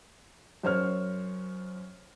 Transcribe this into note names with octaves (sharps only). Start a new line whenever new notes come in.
F#2 C5 C#5 F6